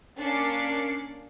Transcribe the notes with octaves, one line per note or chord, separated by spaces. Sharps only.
A#3 C#4 D4 D6 C7 C#7